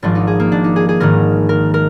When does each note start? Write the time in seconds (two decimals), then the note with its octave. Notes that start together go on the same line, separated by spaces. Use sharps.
0.03 G#1 G#2 F3 D4
0.15 D#4
0.27 G#4
0.40 A#3
0.52 D4
0.64 D#4
0.76 G#4
0.89 G#4
1.00 G#1 G#2 D#3 A#4
1.49 A#4
1.74 A#4